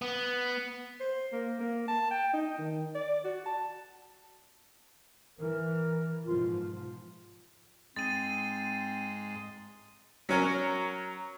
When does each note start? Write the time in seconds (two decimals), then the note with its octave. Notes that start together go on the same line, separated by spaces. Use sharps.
0.02 B3
1.00 C5
1.33 A#3
1.60 A#3
1.88 A5
2.11 G5
2.33 D#4
2.58 D#3
2.95 D5
3.24 F#4
3.46 A5
5.39 E3 A#4
6.26 G#2 B2 F3 F4
7.96 G#2 G#3 C4 C6 A6 D#7
10.29 F#3 C#4 A#4